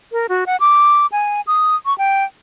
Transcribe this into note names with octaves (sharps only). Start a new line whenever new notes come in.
A#4
F#4
F#5
D6
G#5
D#6
C#6
G5